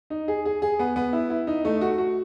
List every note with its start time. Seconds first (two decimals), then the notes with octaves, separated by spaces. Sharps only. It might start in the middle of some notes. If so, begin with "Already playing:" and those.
0.10 D#4
0.28 G#4
0.45 G#4
0.62 G#4
0.79 B3
0.96 B3
1.13 E4
1.30 E4
1.47 D#4
1.65 A3
1.81 F#4
1.98 F#4